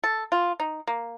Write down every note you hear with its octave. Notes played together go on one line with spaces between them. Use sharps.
A4
F4
D#4
A#3